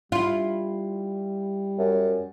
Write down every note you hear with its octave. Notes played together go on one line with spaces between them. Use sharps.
G3 E4 F4
F#2